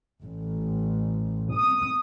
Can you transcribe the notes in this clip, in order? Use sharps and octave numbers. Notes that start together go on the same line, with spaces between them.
A1
D#6